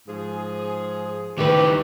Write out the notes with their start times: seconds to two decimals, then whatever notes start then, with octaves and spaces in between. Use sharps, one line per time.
0.08 G#2 F3 G#4
1.38 D2 D#3 E3 G4 B4